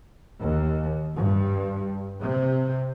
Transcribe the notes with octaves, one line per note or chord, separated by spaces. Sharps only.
D#2
G2
C3